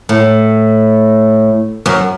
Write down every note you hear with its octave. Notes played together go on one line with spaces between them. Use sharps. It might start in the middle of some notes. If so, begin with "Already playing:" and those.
A2
F#2